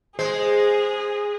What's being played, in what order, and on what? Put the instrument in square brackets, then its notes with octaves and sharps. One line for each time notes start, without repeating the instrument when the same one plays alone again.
[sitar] G#3 [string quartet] G#4 [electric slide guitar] C5